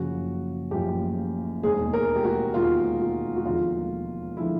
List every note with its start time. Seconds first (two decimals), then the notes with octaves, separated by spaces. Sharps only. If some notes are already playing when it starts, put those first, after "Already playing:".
Already playing: F#1 F#2 C#3 F3 F#4
0.71 F#1 F#2 C#3 F3 G4
1.63 E1 D#2 D#3 G#3 G#4
1.93 A#4
2.16 G4
2.24 F#4
2.54 E1 D#2 D#3 G#3 F4
3.00 F#4
3.36 F#4
3.45 E1 D#2 D3 F3 G#3 F4
4.37 D3 F3 G#3 E4